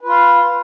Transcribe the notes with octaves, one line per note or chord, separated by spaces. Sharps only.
F4 B4 F5